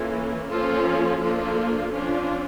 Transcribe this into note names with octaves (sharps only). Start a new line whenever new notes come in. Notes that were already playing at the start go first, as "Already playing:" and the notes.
Already playing: E3 A#3 C#4 F4 A4
F3 A#3 C#4 F4 A4
F3 A#3 D4 F4 A4
F3 C#4 D4 F4